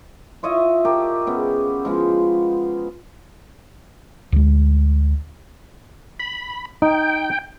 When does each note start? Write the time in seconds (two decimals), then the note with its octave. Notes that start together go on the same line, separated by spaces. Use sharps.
0.43 F4 C#5 D#5 E5
0.85 G4 A#4 A5
1.27 C#3 B3
1.85 F3 G#3 B3
4.32 D2 G#3
6.20 B5
6.82 D#4 G5